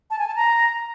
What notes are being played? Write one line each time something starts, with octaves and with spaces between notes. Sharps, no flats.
A5
G#5
A5
A#5